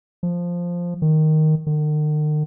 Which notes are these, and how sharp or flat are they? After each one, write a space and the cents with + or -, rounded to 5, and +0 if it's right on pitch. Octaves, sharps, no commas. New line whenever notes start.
F3 +0
D#3 +0
D#3 -45